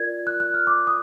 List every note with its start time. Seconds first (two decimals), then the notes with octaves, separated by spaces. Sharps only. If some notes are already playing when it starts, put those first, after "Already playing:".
Already playing: F4 A#4 D5 G#6
0.27 F#6
0.40 F#6
0.54 F6
0.67 D6
0.87 D#6